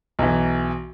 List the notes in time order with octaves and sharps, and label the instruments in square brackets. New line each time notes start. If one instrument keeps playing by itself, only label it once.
[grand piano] B1 E3